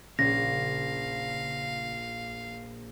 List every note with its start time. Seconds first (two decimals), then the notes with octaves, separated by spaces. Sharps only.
0.19 A#1 C#3 F5 A#6